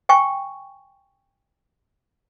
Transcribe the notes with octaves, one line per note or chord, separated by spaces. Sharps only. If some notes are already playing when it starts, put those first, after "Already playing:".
G5 G#5 C#6